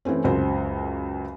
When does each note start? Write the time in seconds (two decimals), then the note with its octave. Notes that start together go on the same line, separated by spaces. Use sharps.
0.05 E3 A3 C4 C#4
0.24 C#2 F#2 A#4 C5